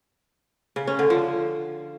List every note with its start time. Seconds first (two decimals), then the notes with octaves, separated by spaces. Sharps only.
0.76 C#3
0.87 C#4
0.99 D3
1.10 F3